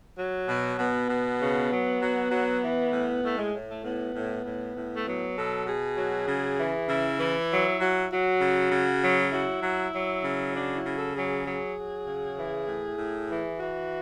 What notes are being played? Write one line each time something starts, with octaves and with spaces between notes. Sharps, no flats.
F#3
B2
B2 B3
B2
C#3
F#3
F#3
F#3
E3
A2
A2 A3
G#3
A2
A3
A2 B3
A2
A2
A2
A3
F#3 B3
B2 A4
B2 G#4
F#3
C#3
E3
C#3 E4
E3
F#3
F#3
F#3 F#4
C#3
C#3
F#3
F#3 E4
F#3
F#3
C#3
F#3 D4
E4
C#3
A4
F#3 G#4
F#3
F#3
C#3
E3
A2
A2
E3
E3 F#4